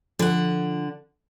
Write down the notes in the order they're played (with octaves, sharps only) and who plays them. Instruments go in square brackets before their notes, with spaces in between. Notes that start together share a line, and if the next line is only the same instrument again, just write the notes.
[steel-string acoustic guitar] D3 F#5 [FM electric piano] F3